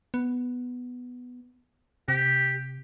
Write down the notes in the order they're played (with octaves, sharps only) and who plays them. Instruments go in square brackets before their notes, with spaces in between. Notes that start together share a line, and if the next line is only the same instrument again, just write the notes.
[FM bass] B3
[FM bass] C3 [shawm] G4